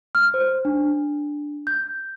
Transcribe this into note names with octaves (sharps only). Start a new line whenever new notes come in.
F6
C5
D4
G6